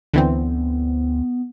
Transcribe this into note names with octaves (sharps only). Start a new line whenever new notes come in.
D2 D3 E3 B3 C4